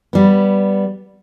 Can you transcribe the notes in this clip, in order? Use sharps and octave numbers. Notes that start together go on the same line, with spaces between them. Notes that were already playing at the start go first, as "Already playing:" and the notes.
G3 B3